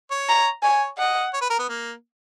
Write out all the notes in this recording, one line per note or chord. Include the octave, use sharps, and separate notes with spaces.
C#5
A#5
C#5 G#5
D#5 F#5
C#5
B4
A#4
B3
A#3